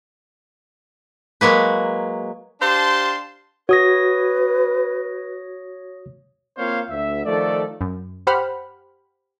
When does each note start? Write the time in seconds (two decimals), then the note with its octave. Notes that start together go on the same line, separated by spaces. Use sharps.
1.41 F#3 G#3 A#3 B4
2.61 D4 G4 C5 F5 A5 C6
3.69 F#4 B4 C#5 D#6 A#6
6.57 A#3 C4 F4 C5 C#5 F5
6.90 D2 E5
7.25 D#3 F3 A3 A4 D5
7.81 F#2
8.27 G4 C5 F#5 B5 F6